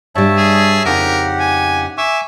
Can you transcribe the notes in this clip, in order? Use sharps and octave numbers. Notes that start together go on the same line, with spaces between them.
G2 G3 C#5 E5 A5
G#4
F2 C#3 D#4 G4 A#4 F#5
G#5
E5 G#5 C#6 D6